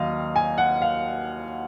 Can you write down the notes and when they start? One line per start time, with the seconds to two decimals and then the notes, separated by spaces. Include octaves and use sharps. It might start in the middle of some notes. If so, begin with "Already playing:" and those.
Already playing: D#2 D#3 F#3 D#5 F5
0.36 G#5
0.58 F#5
0.82 F5